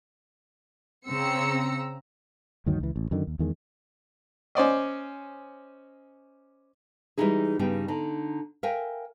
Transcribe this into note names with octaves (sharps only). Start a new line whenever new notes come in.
C#3 C4 A#5 E6 C#7
D2 G2 D#3 F#3
C#2 E3
A1
F#2 D3 D#3
D#2
E2 D#3 G#3
C#4 C5 D5 D#5
E3 G3 G#3 D#4 E4 G#4
G2 C#3 G3 B3 D#4 G5
D3 D#4
A#4 E5 F5 G5 G#5